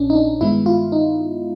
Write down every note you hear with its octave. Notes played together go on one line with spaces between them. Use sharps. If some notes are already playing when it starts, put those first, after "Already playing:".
Already playing: A#1 A#2 C#4 D4
D#4
D4
G2 D#3 G#3 B3 E4
F4
D#4